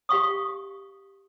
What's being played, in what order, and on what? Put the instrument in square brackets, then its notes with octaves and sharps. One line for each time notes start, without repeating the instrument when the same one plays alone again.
[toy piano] G4 F5 C#6 D#6